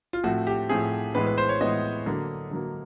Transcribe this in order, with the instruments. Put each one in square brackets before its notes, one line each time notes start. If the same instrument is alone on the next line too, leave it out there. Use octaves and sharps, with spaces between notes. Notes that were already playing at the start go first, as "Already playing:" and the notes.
[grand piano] F4
A2 F3 A3 C4 F#4
G4
A2 F3 A3 C4 G#4
A2 E3 G#3 B3 B4
B4
C5
C#5
A2 E3 G#3 B3 D#5
D3 F#3 A#3
D3 F#3 A#3